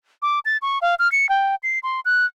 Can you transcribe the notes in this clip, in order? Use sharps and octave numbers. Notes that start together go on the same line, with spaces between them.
D6
A6
C#6
F5
F6
C#7
G5
C7
C6
F#6